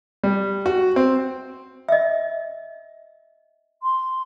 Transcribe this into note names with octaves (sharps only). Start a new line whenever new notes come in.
G3
F#4
C4
D#5 E5
C6